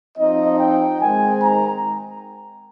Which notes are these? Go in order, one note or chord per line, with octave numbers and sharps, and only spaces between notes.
F3 C4 D#4 D#5
G5
D#3 G#3 C4 D#4 G#5
A#5